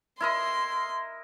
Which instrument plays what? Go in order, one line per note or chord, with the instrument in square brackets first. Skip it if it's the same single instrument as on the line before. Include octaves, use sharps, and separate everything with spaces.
[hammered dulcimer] E4 A#4 D#5 [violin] C6